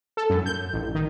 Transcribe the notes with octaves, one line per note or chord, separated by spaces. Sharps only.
A4
F#2
G6
A1
D#3